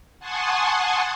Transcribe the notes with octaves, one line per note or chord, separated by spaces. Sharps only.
F#5 G#5 A5 C6 C#6 D#6